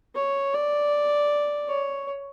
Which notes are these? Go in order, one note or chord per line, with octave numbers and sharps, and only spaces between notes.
C#5
D5
C#5